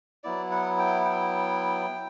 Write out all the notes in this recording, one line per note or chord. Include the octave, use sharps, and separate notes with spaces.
F#3 B3 E4 D5
F#5
G5
G5